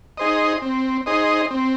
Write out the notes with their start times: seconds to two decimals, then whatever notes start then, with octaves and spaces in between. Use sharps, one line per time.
0.17 D#4 G#4 C5 D#5
0.62 C4
1.06 D#4 G#4 C5 D#5
1.51 C4